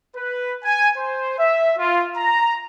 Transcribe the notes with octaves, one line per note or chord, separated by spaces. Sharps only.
B4
G#5
C5
E5
F4
A#5